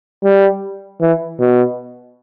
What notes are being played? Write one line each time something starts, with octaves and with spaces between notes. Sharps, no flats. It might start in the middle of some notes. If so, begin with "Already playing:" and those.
G3
E3
B2